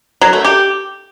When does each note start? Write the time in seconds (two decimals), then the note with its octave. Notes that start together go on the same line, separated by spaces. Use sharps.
0.21 F#3
0.33 A3
0.45 G4